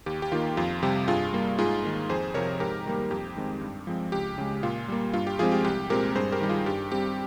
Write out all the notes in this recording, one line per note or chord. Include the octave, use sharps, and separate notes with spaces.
D#2 G4
G4
D#3 A#3 F4
F2 F4
C3 G3 G4
G2 F4 G#4
G3 A#3
G#2 F4 G#4
D#3 A#3
F2 G#4 C5
C3 F3 A#4 C#5
G#2 G4 A#4
D#3 G3 A#3
F2 G4
D#3 G#3 C4
G2
F3 G#3 C4
C#2 G4
C#3 G#3
A#2 F4
G3 A#3
G2 F4
G4
F3 G#3 C4 F4 G#4
G4
C2 G4
A#2 G#3 C4 G4 A#4
G2 G#4 C5
G4 A#4
D#3 G3
F4 G#4
G2 G4
G3 C4 G4